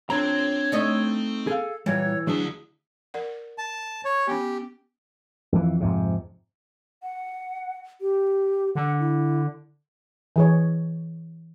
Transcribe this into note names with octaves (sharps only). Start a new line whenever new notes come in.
F2 C4 D4 C#5 A#5
A3 D#4 D#5
G#4 A4 F5
A#2 E3 G3 C#5
D2 F#3 D4 G#4 E5
A#4 D5 F#5
A5
C#5
B3 C#4 G4
F2 E3
F2 G#2 C3
F#5
G4
D3 F#5
E4
E3 G#4 C#5